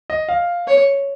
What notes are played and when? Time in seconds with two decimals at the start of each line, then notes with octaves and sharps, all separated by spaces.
0.10 D#5
0.29 F5
0.67 C#5